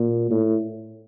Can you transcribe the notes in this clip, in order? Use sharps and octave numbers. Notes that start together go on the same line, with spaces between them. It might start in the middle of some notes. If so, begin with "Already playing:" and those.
Already playing: A#2
A2